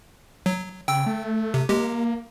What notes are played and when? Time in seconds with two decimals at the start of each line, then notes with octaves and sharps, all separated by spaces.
0.46 F#3
0.88 C#3 G5 E6
1.06 A3
1.54 C3
1.69 G#3 A#3 G4